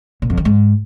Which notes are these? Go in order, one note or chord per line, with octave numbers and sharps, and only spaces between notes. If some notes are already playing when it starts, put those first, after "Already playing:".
A#2
F2
D#3
G#2